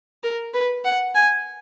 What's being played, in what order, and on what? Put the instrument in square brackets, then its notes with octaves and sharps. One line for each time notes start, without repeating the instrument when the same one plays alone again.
[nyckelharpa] A#4
B4
F#5
G#5